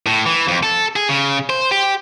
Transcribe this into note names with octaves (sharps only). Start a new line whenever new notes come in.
A2
E3
F2
A4
G#4
C#3
C5
G4